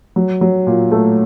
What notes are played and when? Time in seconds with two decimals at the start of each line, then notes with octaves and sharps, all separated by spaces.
0.16 F#3
0.41 F#3
0.67 A#2
0.92 A3